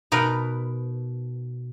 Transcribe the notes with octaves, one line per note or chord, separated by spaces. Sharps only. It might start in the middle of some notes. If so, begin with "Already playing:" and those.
B2 D#4 A#4 B4 D7